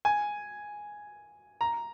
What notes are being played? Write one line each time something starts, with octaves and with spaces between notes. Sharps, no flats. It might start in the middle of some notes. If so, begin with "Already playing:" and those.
G#5
A#5